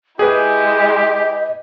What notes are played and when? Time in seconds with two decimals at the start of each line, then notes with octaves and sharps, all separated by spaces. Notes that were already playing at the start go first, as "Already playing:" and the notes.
0.19 G#3 E4 G4 G#4 B4 D#5